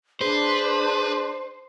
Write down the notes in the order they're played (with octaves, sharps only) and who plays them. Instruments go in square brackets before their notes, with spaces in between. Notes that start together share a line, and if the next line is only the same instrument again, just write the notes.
[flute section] D4 C6 [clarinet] G#4 [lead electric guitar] B4 [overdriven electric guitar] C5